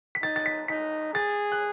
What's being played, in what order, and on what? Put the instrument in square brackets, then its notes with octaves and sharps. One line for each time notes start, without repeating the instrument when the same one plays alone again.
[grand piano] B6
[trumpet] D#4 [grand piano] A6
[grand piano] A6
B6
[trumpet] D#4 [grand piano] B6
[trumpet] G#4 [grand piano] A6
[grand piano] F#6